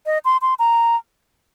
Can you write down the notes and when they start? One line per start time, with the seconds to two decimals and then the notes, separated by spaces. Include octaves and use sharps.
0.06 D#5
0.25 C6
0.42 C6
0.59 A#5